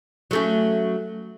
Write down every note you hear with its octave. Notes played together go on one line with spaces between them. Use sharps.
F#3 A3 C#4